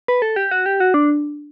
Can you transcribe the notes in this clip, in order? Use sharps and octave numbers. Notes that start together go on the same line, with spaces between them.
B4
A4
G4
F#4
G4
F#4
D4